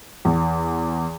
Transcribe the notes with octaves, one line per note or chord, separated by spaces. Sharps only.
E2